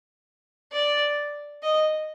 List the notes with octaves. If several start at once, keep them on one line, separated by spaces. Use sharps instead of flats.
D5
D#5